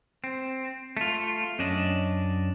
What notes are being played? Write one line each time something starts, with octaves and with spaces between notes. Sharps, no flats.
C4
A3 F4
F#2 C#4 D4 D#5